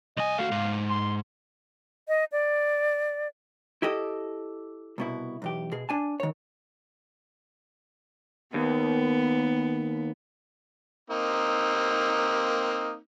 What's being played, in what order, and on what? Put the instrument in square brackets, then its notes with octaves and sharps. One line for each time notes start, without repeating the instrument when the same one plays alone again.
[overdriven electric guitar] C2 G#5 [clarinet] D#5
[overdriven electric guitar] A3 F#4 [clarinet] F5
[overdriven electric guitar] G#2
[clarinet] C6
[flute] D#5
D5
[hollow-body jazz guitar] E4 G4 A4 D#5
C2 B2 E4
B1 E2 G4
B2 G#4
D4 G#5 A5
D#3 C#5
[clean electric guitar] D#2 [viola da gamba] B3
[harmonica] A#3 C4 D#4